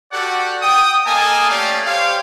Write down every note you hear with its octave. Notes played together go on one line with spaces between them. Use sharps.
F#4 G4 A4 D5 F#5
G5 D#6
A#3 A4 D#5 F5 G#5 A5
A3 C#4 G4 C#5 D5 F5
G4 C5 C#5 F5